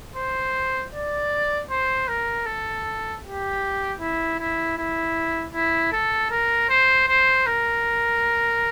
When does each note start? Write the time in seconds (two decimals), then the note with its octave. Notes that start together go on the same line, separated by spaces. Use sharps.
0.15 C5
0.92 D5
1.70 C5
2.08 A#4
2.46 A4
3.24 G4
4.00 E4
4.39 E4
4.77 E4
5.53 E4
5.92 A4
6.30 A#4
6.69 C5
7.08 C5
7.46 A#4